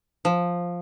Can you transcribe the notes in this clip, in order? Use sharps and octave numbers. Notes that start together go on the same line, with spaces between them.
F3